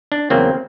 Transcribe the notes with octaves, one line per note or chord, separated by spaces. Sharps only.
D4
E2 C#3 F#3 A#3 C4